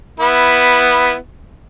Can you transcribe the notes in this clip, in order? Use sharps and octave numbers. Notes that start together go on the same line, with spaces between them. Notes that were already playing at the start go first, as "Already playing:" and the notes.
B3 E4